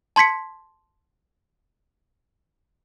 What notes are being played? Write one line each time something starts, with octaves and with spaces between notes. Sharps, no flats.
A5 C6 G#6 B6 C#7